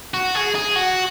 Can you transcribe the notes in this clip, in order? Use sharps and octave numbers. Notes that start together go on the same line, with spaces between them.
F#4
G#4
G#4
F#4